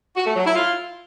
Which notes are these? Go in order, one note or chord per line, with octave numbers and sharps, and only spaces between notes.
F#4
A3
F#3
E4
F4